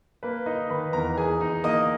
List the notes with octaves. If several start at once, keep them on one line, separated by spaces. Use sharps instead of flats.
A#3 B4
A#3 D#4 D#5
D#3 B4 B5
E2 A#4 A#5
E2 G#4 G#5
D#4
A#3 D#5 D#6